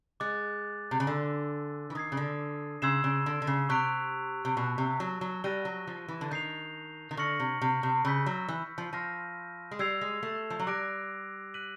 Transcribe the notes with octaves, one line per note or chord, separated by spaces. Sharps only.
G#3 D6 F#6 A6
C3
C#3
D3 G#5 C6 E6
E3
D#3 D#6 G#6 C7
C#3
D3
C#3 C6 E6 G#6 C7 E7
C#3
D3
D3
C#3
C3 C#6 F#6 B6 D7 F7
C3
B2 A5 C#6 F#6
C3
F#3
F#3
G3 F#6 A#6 D#7 G7
F#3
F3
E3
D3
D#3 G6 C7 F7
D#3
D3 C#6 F6 A#6 C#7 F#7
C3
C3
C3
C#3 B5 E6 G6 B6
F#3
E3
F3
F3 C6 F6 A#6 D#7
G#3
G3 E6 G#6 C7 F7
G#3
A3
F3
F#3
G3 D6 F#6 A#6 D7
F#6 B6 D#7 F#7